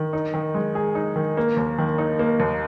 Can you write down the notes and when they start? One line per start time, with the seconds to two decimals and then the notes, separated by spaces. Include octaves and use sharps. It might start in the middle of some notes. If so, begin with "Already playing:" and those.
Already playing: D#3
0.13 D#4
0.34 D#3
0.54 G#3
0.75 G#4
0.95 D#4
1.16 D#3
1.37 A#3
1.57 D#2
1.79 D#3
1.98 D#4
2.19 A#3
2.40 D#2